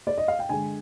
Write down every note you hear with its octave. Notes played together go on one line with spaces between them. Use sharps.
D5
D#5
F5
G5
D3 G#3 G#5